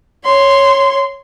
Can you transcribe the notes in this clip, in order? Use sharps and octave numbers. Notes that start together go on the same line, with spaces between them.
C#5 C6